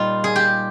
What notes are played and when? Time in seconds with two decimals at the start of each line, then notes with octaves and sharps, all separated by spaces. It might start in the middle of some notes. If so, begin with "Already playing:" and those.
Already playing: A#2 G3 D#4 F4
0.24 G#4
0.36 G4